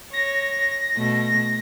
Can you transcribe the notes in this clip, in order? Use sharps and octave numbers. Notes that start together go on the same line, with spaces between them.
C#5 A#6
B2 A3